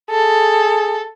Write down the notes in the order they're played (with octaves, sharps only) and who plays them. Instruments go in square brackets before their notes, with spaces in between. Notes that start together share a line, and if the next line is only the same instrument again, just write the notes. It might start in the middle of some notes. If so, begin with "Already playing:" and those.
[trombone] G#4 [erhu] A4